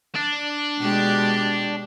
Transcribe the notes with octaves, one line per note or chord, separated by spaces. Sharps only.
D4
B2 G#3 G4